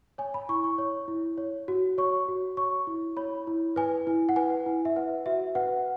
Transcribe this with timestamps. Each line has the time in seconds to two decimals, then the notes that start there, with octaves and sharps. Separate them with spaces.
0.18 C#5 G#5
0.34 B5
0.49 E4 C#6
0.64 C#6
0.78 C#5
1.08 E4
1.38 C#5
1.68 F#4
1.98 C#5 C#6
2.28 F#4
2.57 C#5 C#6
2.87 E4
3.17 C#5 B5
3.47 E4
3.76 B4 G#5
4.07 E4
4.29 F#5
4.36 B4 G#5
4.66 E4
4.85 E5
4.96 B4 F#5
5.26 F#4 E5
5.55 B4 F#5